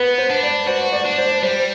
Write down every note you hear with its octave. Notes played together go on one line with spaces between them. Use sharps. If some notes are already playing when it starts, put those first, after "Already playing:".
Already playing: B3 B4
C5
D4
D5
F#4 C5
D5
D4
C5
G3 C5